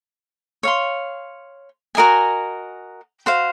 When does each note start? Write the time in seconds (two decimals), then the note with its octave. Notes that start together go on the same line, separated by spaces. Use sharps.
0.63 C#5 F5 C6
1.95 F#4 A#4 D#5 G#5
3.26 F#4 C5 F5